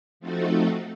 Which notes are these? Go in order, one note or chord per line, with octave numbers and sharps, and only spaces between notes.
F3 A3 C4 D#4 F#4 A4